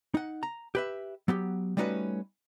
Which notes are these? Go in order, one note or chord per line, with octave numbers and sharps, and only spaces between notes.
D#4 F#5
A#5
G4 B4 E5
F#3 B3 G4
G3 A3 C#4 D#4 F#4 B4